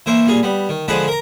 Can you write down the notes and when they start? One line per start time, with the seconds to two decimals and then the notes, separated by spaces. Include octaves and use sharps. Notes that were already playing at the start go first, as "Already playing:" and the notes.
0.06 E3 A#3 C5 E5
0.27 A#2 G3 G#4 G#5
0.43 G3 B3
0.69 D#3
0.88 D3 F3 G#3 G#4 F#5 B5
1.08 A#4 A#5